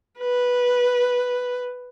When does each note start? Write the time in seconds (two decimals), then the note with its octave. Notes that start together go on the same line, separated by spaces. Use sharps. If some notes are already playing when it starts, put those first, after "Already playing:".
0.19 B4